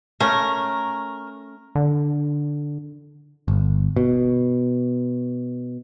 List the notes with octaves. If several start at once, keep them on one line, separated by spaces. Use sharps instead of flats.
A3 C#4 A#4
D3
G1
B2